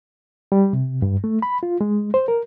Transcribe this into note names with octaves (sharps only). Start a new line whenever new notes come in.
G3
C3
G2
A3
B5
F4
G#3
C5
A#4